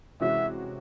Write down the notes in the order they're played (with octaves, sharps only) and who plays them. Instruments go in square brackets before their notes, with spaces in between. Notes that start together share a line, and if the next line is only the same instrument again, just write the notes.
[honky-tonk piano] C3 E3 G#3 C#4 F#4 [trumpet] E5